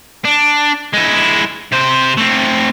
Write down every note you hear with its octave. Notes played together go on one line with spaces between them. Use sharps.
D4
G#3 E4
C3 C5
A3 C4